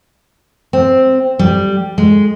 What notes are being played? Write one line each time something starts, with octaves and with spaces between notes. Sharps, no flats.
C4
G3
G#3